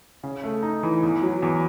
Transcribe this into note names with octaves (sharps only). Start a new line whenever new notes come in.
C#3
A3
D#4
E3
E2
F#3
E2